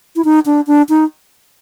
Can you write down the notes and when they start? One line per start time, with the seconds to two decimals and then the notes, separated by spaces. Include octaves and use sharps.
0.16 E4
0.24 D#4
0.46 D4
0.67 D4
0.89 D#4